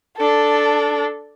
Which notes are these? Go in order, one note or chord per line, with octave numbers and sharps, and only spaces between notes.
D4 A4